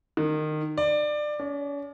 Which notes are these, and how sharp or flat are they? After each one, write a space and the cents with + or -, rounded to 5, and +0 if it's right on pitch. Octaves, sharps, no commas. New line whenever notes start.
D#3 -25
D5 +20
C#4 +45